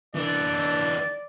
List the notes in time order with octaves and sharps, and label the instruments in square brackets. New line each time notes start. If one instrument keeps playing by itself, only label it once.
[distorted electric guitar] E3 D4 [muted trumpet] D5